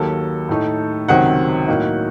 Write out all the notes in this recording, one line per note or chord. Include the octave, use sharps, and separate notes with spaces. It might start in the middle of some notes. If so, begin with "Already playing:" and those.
Already playing: D#2 D#3 F#3 A#3 A4
A2 A3 D#4
C#2 C3 D#3 F#3 C4 F#5
A2 F#3 A#3 D#4